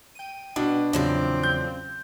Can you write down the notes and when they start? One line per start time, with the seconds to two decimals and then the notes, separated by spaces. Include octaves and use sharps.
0.15 G5 D#7
0.56 B2 D4
0.93 E2 A2 C#3 F3 F#3 C4 D5
1.43 G6